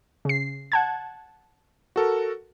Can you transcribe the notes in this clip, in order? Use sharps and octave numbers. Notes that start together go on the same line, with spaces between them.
C#3 C7
F#5 A5 G#6
F#4 A4 A#4